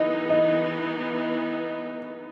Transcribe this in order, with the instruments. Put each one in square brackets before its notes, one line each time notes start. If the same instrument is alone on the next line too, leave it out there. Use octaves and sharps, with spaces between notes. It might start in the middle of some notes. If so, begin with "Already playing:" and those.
Already playing: [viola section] E3 B3 D#4 [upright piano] D#5
[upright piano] D#5